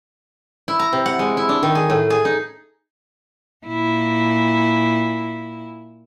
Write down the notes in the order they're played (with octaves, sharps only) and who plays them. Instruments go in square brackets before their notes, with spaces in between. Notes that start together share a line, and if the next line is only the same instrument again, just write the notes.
[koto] E4
A#5
C3
F#5
G#3
E4
D4
D#3
G#4
A2
G#4
D#4
[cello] A#2 E4